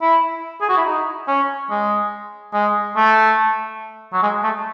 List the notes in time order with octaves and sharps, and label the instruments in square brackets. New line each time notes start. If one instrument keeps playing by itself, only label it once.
[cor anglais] E4
G#4
F#4
E4
D#4
C#4
G#3
G#3
A3
F#3
G#3
A3